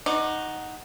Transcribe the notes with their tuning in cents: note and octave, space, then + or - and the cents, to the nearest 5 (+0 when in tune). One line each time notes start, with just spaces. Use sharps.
D#4 +0 F#4 +0 D5 +30